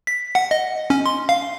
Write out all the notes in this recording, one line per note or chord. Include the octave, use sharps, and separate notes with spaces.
B6
F#5
D#5
C#4
C6
F5